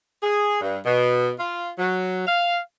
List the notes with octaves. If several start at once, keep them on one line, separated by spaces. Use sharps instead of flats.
G#4
G2
B2
F4
F#3
F5